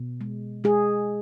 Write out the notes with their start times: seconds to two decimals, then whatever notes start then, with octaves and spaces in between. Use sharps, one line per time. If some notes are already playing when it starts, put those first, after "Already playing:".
Already playing: B2
0.21 G#3
0.64 G#3 G#4